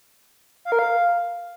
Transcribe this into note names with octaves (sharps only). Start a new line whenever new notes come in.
F5
A#4
F5